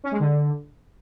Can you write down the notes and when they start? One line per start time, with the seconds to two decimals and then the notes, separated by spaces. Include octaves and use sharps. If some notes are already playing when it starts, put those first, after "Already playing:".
0.04 C#4
0.12 G#3
0.20 D3